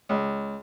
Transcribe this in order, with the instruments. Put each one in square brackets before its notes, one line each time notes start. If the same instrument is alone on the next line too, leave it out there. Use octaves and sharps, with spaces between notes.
[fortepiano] C#2